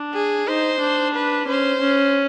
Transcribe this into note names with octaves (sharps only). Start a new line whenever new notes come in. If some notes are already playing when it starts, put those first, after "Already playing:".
Already playing: D4
G#4
D#4 C5
D4
B4
C#4 C5
C#4